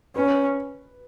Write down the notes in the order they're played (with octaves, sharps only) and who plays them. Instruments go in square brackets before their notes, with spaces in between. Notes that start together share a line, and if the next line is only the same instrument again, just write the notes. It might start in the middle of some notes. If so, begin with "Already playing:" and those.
[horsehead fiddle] C#4 [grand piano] B4